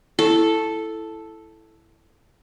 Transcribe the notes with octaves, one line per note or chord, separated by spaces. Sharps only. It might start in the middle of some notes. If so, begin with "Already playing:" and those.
E4 A4